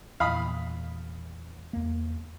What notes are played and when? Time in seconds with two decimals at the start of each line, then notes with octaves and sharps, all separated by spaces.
0.20 E2 A#2 F5 B5 D#6
1.73 E2 A#3